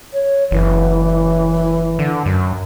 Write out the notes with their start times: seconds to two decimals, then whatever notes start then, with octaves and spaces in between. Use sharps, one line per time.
0.13 C#5
0.51 F#1 E3
1.99 D3
2.26 F#2